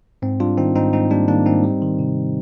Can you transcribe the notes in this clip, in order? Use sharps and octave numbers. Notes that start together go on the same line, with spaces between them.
G#2 C4
G3 D4 F4
D#3 C4 D#4
G#2 C4 D#4
G#2 C4 D#4
G3 A#3 D4
D#3 A#3 D4
G#2 C4 D#4
G3
D#3
C3